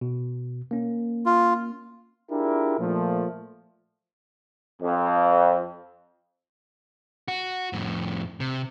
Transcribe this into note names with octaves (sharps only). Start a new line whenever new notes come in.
B2
A#3 C#4
F4
D4 E4 F4 G4 G#4 A#4
A#2 F3 A3
F2
F#4
F2 A2
C3